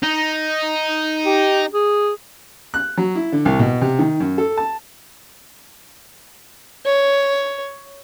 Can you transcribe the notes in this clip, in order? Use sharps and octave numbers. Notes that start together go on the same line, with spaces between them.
D#4
G4
G#4
F#6
F#3
E4
D3
C2
B2
C3
D#3
F#2
A4
A5
C#5